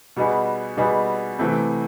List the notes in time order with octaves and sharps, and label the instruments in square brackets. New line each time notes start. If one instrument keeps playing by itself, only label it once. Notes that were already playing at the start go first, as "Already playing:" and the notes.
[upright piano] B2 G3 B3 D#4 G#4
B2 G3 B3 D#4 G#4
C3 E3 A3 C4